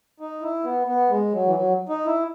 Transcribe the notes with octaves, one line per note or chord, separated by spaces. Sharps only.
D#4
E4
B3
B3
G#3
F#3
E3
F#3
D#4
E4